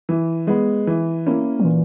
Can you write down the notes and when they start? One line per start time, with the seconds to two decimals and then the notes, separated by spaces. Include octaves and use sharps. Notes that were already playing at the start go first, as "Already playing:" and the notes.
0.09 E3
0.47 G#3 B3
0.87 E3
1.26 A#3 C#4 E4
1.59 F#3
1.64 A#2 E3